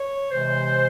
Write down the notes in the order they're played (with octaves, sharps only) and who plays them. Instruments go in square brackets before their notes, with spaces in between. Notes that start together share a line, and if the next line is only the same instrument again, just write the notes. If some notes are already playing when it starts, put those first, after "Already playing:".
Already playing: [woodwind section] C#5
C3 E3 G#3 C5